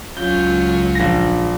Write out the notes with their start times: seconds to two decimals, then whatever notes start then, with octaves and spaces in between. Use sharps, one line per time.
0.17 C#2 F#3 C#4 F4 G6
0.95 A#1 A#6